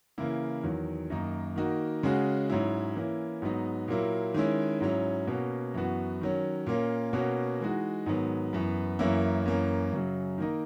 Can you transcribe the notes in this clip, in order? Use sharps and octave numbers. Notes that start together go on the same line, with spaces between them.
C#3 E3 A#3 E4
E2 D#3 F#3
F#2 D#3 A#3 D#4
D#3 A#3 D#4 F#4
C#3 G#3 C#4 F#4
G#2 F#3 C#4 E4
E3 A#3 C#4 E4
G#2 F#3 B3 D#4
A#2 F#3 A#3 E4
D#3 G#3 C#4 E4
G#2 F#3 C#4 E4
B2 A#3 C#4 F#4
F#2 E3 B3 F#4
D#3 F#3 C#4
A#2 A#3 C#4
B2 A#3 C#4 F#4
E3 G#3 D#4 F#4
G#2 D#3 F#3 B3
F#2 E3 B3
F#2 E3 A#3 C#4 E4
F#2 E3 A#3 C#4
F#2 C#3 F#3
D#3 A#3 D#4